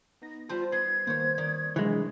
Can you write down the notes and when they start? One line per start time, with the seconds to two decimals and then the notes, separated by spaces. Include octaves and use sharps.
0.22 B3 D#4 A#6
0.49 G3 F4 C5 A5
0.72 B3 G#6 C7
1.07 D#3 A#3 C5 C#5
1.38 D#3 D5
1.76 C3 E3 F#3 G#3 D4 C#5